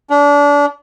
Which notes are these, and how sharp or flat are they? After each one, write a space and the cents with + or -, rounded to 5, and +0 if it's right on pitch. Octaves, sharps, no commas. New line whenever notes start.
D4 -30